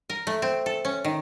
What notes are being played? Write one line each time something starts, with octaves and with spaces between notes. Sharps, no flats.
A#4
A3
C4
A4
C#4
D#3